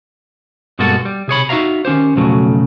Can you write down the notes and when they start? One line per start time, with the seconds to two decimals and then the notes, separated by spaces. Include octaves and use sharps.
0.79 G2 B2 G#3 A#3 F#4 A4
1.05 G3
1.28 C3 G#4 C#5 B5
1.49 D#4 F#4 G#4 E5 F5 A#5
1.85 D#3 C#4 G4 C5
2.16 B1 F2 C#3 F#3 A3